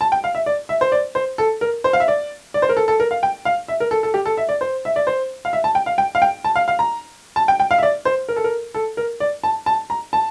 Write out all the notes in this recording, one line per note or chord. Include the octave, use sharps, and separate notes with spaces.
A5
G5
F5
E5
D5
E5
C5
D5
C5
A4
A#4
C5
F5
E5
D5
D5
C5
A#4
A4
A4
A#4
F5
G5
F5
E5
A#4
A4
A4
G4
A4
E5
D5
C5
E5
D5
C5
F5
E5
A5
G5
F5
G5
F5
G5
A5
F5
F5
A#5
A5
G5
G5
F5
E5
D5
C5
A#4
A4
A#4
A4
A#4
D5
A5
A5
A#5
A5